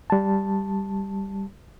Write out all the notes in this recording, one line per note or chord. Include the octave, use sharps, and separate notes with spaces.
G3 A5